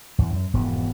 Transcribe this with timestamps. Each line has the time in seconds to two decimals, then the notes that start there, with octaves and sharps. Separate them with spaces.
0.18 E2
0.30 F#2
0.54 E1 F2 G#2 B3